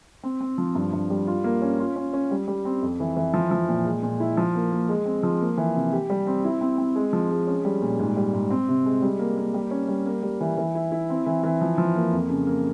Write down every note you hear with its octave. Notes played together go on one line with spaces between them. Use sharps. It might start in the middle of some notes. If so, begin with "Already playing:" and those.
C4
C4
F3
G2
G2
G3
F4
A#3
C#4
F4
C#4
C#4
G3
G3
C4
F2
E3
E3
F3
F3
A#2
G#3
A#2
E4
F3
A#3
A#3
G#3
C4
F3
A#3
E3
C3
G4
G3
C4
E4
C4
C4
G#3
F3
G#3
C#4
G3
A#2
G#2
G3
G#2
C4
C3
G#3
G3
A#3
A#3
G3
C#4
G3
A#3
G3
E3
E3
E4
E4
C4
E3
E3
F3
F3
A#3
F2
C#3
A#3